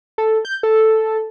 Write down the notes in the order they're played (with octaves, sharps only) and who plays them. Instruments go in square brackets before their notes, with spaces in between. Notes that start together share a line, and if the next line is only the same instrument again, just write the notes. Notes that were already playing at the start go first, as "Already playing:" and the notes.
[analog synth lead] A4
G6
A4